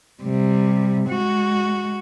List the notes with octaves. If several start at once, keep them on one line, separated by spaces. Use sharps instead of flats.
C3 G3
G#3 F#4